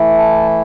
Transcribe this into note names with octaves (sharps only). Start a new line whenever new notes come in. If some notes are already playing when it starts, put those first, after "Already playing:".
Already playing: E3 A3 E4
A5